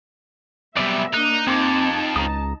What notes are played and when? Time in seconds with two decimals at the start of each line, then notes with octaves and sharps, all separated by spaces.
0.77 F#2 C3 G3 B3 D5 E5
1.14 A#3 D4 D#4 F#6
1.47 F2 C4 D#4 G#4 A5 C6 D6
2.16 C#2 A#5 D#6